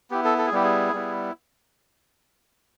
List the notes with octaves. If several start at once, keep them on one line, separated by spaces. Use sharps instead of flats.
B3 E4 G4
A4
A4
G#4
G3 B3 E4 G4
G#4
G3 B3 E4